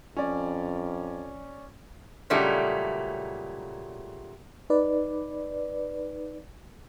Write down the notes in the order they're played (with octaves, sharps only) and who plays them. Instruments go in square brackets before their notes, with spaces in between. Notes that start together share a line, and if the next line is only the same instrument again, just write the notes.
[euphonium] F2 [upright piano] C#4 D5
[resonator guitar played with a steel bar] A#2 C#3 F#3 G3 A3 D#4
[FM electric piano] D#4 B4 D5